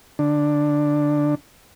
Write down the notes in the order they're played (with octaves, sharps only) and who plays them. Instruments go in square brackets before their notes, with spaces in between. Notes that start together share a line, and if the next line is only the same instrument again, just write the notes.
[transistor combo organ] D3 D4